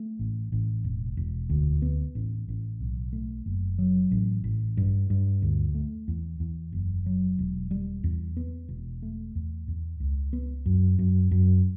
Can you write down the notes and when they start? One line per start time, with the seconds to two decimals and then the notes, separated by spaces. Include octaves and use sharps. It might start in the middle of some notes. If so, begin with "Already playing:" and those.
Already playing: A3
0.19 A1
0.52 A1
0.84 E1
1.17 E1
1.50 D2
1.82 B3
2.15 A1
2.48 A1
2.80 B1
3.13 A3
3.46 F#1
3.78 F#3
4.11 A1
4.44 A1
4.77 G2
5.10 G2
5.42 D2
5.75 A3
6.08 E2
6.40 E2
6.72 F#1
7.06 F#3
7.39 E1
7.71 G3
8.04 E2
8.37 B3
8.69 E1
9.02 A3
9.35 E2
9.68 E2
10.00 C#2
10.33 B3
10.66 F#2
10.99 F#2
11.31 F#2